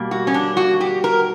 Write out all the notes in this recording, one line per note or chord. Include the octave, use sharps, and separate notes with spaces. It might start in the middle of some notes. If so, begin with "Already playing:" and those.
Already playing: B2 G3 A#3
F#4
C#4
D4
F#4
G4
A#4